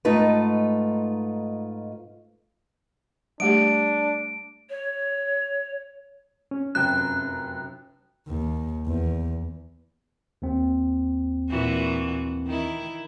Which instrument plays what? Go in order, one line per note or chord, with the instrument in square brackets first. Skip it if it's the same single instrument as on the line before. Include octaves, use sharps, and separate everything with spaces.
[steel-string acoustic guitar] G#2 A3 D#4 F4 B4
[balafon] G3 A3 G4 [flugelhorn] D4 [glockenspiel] D7
[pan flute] C#5
[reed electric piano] C#4
[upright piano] F1 F#2 G5 [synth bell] F#6
[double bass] D#2
E2
[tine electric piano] D#2 C4
[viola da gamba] A#2 E3 F#4
D#3 E4